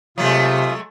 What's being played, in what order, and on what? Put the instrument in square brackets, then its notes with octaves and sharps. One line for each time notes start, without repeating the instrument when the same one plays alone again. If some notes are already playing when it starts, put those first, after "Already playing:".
[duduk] C3 [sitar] F#3 G#3 A3 [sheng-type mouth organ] F4 D#6